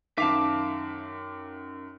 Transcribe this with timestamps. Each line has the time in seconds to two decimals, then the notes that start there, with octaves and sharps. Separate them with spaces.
0.18 F#2 D#3 E5 F5 A5 D6